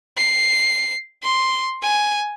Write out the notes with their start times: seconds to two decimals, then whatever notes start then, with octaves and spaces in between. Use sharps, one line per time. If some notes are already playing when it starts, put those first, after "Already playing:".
0.17 C7
1.23 C6
1.82 G#5